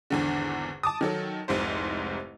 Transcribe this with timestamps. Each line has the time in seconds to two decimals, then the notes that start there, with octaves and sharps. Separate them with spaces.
0.10 G#1 E2 D3
0.83 A5 D6 D#6
1.01 D#3 F#3 A4
1.48 F1 C2 G#2 C5